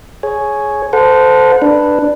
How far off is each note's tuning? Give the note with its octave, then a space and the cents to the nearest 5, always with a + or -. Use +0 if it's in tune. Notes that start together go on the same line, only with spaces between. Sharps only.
G#4 +15 C#5 +0
A4 +0 C5 -25 F#5 -35
D4 +10 B4 +0